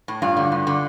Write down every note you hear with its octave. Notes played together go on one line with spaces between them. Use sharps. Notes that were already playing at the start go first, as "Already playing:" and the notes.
A2
G2 F4
D3
G2
D3